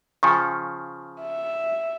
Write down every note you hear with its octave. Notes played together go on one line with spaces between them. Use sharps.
C#3 F3 G5 G#5 C#6
E5